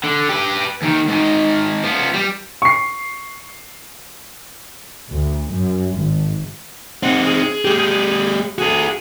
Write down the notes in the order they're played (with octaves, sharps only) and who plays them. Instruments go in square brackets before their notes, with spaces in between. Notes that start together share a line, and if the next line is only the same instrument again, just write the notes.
[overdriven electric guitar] D3
G4 B4
D#2 D#3
G#2 D#3
F3 B3
G3
[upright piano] C#6 C7
[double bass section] D2
F#2
G#1
[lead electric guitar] C4 D#4 [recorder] F#5
[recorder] G#4
[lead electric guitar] G#3 G4
[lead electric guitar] F#4 A4 [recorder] G#4